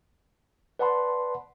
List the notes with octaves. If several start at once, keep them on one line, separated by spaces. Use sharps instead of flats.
B4 D5 F#5 A5 B5 C6